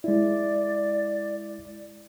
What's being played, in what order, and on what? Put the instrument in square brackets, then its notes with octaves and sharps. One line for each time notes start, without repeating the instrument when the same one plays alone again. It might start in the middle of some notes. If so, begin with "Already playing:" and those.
[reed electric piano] G#3 E4 [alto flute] D5